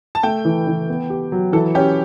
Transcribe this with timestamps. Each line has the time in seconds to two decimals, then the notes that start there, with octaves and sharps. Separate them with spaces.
0.15 A5
0.23 A3 G5
0.45 E3
0.67 E3
0.88 B3
1.10 G4
1.32 F#3
1.53 E3 A4
1.75 C#4 G4